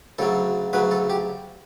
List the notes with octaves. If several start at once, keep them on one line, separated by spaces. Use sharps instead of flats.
D2 C#3 F#3 A4
D2 C#3 F#3 B4
A4
G4